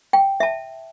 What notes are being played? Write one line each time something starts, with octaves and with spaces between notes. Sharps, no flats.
G5
E5 A5